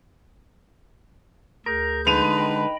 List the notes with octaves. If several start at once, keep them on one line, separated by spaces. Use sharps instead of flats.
D2 G#4 A#4 G6
D3 G#3 D#4 B4 D#7 F7
D#5 G5 B5